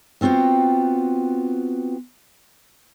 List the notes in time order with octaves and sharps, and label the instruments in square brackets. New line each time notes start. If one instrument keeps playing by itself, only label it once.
[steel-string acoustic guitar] B3 C4 F4 F#4 G5